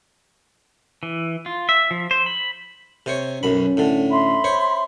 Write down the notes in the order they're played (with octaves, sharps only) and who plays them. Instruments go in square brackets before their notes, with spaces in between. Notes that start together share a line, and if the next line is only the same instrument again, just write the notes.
[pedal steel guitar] E3
F4
E5
F3
C5
B5
[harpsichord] C3 C5 C#5
[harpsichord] B1 F#2 B5 [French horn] C#4
[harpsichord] A2 D3
[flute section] E5 B5 C6
[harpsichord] C5 C#5